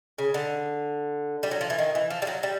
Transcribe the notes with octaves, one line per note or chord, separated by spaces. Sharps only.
C#3
D3
G3
F#3
F3
E3
D#3
E3
F3
G3
F#3
G3